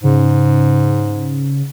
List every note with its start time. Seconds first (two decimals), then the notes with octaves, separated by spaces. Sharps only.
0.03 G#2 C#3